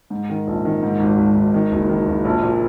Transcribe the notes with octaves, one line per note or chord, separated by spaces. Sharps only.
G#2
D#3
A#1
D#3
G#2
G#1
G#1
G#1
D#3
F#1
D#3
F#1
A#1
A#2